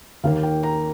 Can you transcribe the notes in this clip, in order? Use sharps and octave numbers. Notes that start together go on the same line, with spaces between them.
D#2 D#3 A#3 F5
G5
A#5